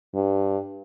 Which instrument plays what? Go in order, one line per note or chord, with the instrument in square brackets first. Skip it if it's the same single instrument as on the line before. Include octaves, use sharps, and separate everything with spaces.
[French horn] G2